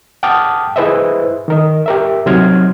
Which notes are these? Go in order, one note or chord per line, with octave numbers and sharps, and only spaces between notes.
F#5 G5 A5 D6 D#6 F6
E4 G#4 B4 C5 D#5 E5
D#3 A#4 D#5
G4 A#4 E5
C3 F#3 D#4 C6 F6 G#6